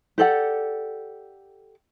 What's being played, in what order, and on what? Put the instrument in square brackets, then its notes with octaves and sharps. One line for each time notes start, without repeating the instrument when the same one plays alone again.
[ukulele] G4 A4 D5 F#5